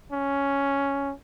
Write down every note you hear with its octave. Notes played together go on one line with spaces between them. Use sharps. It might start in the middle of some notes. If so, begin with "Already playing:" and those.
C#4